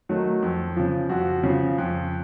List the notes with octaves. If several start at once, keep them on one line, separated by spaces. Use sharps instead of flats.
D#3 F#3 A3
F2
C#3 F3
F2 F#4
C#3 F3
F2